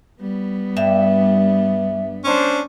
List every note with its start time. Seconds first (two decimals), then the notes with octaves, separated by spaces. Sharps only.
0.21 G3 B3
0.77 G2 E5
2.25 C#4 D4 C5